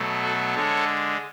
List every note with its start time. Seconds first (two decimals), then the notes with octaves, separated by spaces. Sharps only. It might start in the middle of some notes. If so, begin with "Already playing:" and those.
Already playing: B2 F#3 A3
0.23 F#4 A4
0.55 D3 G#3 A4 C#5